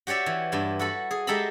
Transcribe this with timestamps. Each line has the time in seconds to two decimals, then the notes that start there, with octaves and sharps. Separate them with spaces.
0.07 F#4 G4 C#5 D5 E5
0.26 E3
0.52 G2 E4
0.79 F#4 A4 B5
1.11 G#4
1.27 G#3 G4 A4 E5 A#5 B5